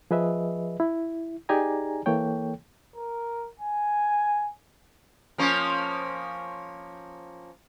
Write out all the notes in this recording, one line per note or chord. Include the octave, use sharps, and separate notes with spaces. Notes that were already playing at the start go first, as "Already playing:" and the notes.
F3 G#4 B4 D#5 E5
E4
D#4 G4 G#4 D5 G#5 A#5
E3 A#3 A4 C#5 G5
A#4
G#5
F3 A#3 C#4